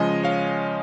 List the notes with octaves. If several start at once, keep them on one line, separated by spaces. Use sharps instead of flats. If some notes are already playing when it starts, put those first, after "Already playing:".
Already playing: C#3 F3 G#3 D#5 G#5
C#5 F5